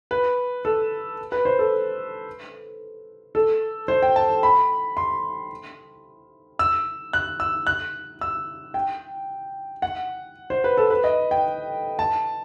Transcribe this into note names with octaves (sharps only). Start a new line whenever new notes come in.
B4
A4
B4
C5
A4
A4
C5
G5
A5
B5
C6
E6
F#6
E6
F#6
E6
G5
F#5
C5
B4
A4
B4
D#5
G5
A5